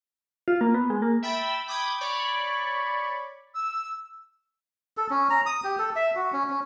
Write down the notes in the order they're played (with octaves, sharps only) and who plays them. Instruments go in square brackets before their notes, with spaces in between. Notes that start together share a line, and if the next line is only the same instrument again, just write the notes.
[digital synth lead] F4
A#3
B3
G#3
A#3
[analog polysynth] E5 G5 B5 E6 A6
G5 B5 D6 D#6 G6 G#6
C#5 D5 B5 C#6
[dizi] E6
[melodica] A4
C#4
A#5
D#6
G4
A4
E5
F#4
C#4
C#4